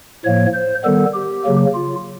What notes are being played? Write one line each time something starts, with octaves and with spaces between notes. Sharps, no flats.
A2 F3 A#3 C#5
C5
D#3 G3 B3 A4
G4
C#3 F#3 A#3
F4